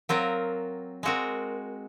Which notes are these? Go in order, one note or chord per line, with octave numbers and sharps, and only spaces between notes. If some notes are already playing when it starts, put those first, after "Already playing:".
F#3 C4 F4 A#4
G#3 C4 F#4 A#4